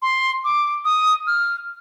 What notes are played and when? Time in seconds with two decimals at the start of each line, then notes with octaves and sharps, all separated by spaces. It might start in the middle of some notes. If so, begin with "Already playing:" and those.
0.02 C6
0.44 D6
0.85 D#6
1.27 F6